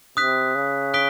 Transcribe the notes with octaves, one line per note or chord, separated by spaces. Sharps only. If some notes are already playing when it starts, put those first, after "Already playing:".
C3 D#6 F#6 B6
C#3
D#6 F#6 B6 D7 G7